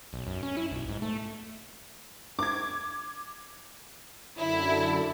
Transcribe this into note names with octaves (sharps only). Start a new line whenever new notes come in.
B1
F#2
C#4
E4
B1
G#2
A3
D6 G#6
F#2 D3 E4